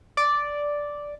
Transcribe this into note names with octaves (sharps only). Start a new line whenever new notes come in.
D5